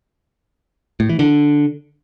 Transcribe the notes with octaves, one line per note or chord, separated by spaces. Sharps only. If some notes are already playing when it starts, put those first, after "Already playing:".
A2
E3
D3